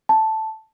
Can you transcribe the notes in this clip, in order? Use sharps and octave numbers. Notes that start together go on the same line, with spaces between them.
A5